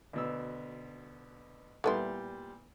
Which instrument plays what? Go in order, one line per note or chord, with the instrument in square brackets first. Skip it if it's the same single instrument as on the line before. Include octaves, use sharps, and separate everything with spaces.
[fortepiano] D2 B2 E6
[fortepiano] A#2 G3 C6 [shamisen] A3 B3 E4